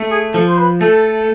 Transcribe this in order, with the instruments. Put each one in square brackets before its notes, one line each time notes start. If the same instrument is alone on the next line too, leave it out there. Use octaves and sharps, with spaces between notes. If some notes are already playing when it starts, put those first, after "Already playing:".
Already playing: [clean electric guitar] A3
[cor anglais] G#4
[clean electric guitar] F3 [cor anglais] A4
[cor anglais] C5
B4
[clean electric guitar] A3 [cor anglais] A4